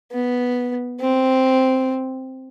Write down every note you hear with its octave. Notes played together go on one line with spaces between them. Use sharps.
B3
C4